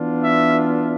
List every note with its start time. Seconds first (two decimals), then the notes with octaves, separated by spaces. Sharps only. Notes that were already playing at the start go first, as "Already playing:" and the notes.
Already playing: E3 B3 D4 F4
0.24 E5